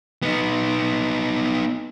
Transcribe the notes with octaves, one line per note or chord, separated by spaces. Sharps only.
B3 D#4